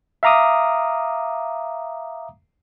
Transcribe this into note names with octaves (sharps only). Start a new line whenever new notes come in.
E5 F5 A#5 D6 D#6